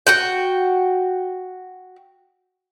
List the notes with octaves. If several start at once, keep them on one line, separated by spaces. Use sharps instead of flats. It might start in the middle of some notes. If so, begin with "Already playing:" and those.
F#4 F#5 G5